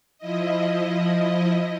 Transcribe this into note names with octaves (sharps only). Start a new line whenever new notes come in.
F3 E4 D#5